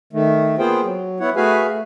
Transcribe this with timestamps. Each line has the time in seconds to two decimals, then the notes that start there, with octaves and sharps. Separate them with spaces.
0.13 D#3 A3
0.59 A#3 B3 F4 G#4 C5 G5
0.81 F#3
1.20 B3 E4 C#5 F#5
1.36 A3 F#4 G#4 B4 F5 G#5
1.69 A3